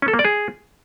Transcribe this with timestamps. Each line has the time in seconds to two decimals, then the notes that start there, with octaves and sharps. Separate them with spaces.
0.02 C#4
0.08 A4
0.13 A#3
0.19 D5
0.25 G#4